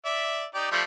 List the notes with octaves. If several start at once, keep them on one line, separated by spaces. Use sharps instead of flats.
D5 E5
D#4 G4 D5
F3 G3 A3